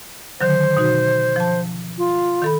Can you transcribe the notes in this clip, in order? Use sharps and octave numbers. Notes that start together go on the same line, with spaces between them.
D3 D#3 F#3 C5
B2 D#4 F#4
F3 A5
F4
D#3 A4 B5